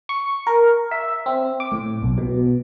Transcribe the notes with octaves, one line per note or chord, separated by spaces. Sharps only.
C#6
A#4
E5
C4
D6
A2
B1
B2